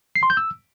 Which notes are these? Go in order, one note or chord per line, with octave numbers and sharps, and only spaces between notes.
C7
C6
G6
E6